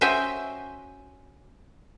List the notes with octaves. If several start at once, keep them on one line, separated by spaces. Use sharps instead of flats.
C#4 F#4 C5 D#5 E5 G5